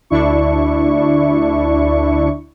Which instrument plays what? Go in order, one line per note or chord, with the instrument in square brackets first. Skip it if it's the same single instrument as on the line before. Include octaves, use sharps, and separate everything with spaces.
[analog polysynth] D2 D4 E4 C#6